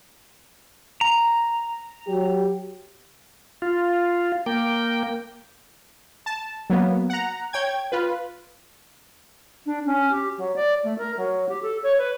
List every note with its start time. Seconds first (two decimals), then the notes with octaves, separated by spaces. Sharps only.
1.01 A#5
2.08 F#3 G4
3.62 F4
4.46 A#3 G5
6.26 A5
6.70 F#3 A#3 B3
7.10 F#5 A#5
7.53 C#5 G5 G#6
7.92 F4 B4
9.66 D4
9.86 C#4
10.10 G4
10.37 F#3
10.56 D5
10.83 A3
10.98 A#4
11.17 F#3
11.48 G4
11.62 A4
11.83 C#5
11.97 B4